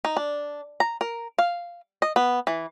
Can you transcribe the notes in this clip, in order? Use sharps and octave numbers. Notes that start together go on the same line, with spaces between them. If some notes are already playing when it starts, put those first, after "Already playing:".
D#4
D4
A#5
A#4
F5
D#5
B3
E3